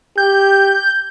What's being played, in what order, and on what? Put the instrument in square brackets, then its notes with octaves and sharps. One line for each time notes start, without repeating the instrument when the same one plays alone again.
[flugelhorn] G4 [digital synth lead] G6